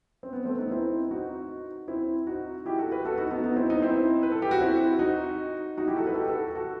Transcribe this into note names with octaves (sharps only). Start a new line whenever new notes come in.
C4
B3
A3 C4
B3 D#4
C4 E4
D#4 F#4
C4 E4
D#4 F#4
E4 G4
F#4 A4
G4 B4
F#4 A4
D#4 F#4
B3 D#4
B3 D#4
C4 E4
B3 D#4
C4 E4
B4
A4
G4
F#4
C4 E4
D#4 F#4
D#4 F#4
E4 G4
F#4 A4
B4
A4
G4
F#4 A4
F#4 A4